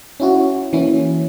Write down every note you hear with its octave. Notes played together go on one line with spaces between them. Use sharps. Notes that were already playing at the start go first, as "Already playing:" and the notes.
C#4 E4 F#4
E3 A#3 C#4 E4